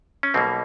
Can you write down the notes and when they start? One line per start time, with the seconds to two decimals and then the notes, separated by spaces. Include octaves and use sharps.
0.23 C#4
0.34 B1 B2 G3 A#3 C4